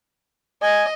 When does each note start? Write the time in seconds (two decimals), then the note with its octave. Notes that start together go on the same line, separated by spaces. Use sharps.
0.63 D#5 G#5